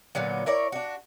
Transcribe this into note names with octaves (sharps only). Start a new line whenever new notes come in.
A#2 D3 F#3 B3
E4 A#4 C#5 D5
D4 F#4